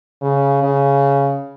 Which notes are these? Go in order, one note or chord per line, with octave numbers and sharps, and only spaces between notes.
C#3
C#3